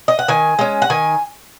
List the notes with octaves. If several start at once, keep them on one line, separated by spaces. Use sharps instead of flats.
D#5
F#5
D#3 G#5
G#3 C#4
F#5
D#3 G#5